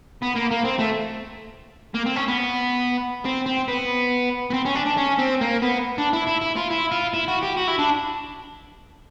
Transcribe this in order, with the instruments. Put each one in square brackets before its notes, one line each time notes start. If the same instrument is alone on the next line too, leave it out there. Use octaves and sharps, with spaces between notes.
[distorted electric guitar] B3
A#3
A#3
C4
A3
A#3
C4
C#4
B3
C4
C4
B3
B3
C4
C#4
D4
D4
C#4
C4
A#3
B3
D4
E4
E4
E4
F4
E4
F4
E4
F#4
G4
F#4
E4
D4